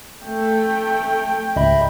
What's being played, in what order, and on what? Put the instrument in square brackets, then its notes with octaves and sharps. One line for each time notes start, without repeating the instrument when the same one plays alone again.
[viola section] A3 [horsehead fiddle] G5
[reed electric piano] C#2 G#2 [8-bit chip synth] D#5 E5 B5